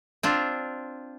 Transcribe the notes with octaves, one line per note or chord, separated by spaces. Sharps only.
C4 D4 F4